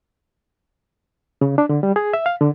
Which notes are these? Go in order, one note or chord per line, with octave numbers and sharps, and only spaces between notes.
C#3
D4
D3
G3
G#4
E5
F5
D3